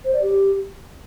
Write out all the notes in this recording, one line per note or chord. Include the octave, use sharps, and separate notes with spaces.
C5
D5
G4